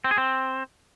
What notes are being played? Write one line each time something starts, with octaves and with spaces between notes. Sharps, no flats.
C4
G#4
C4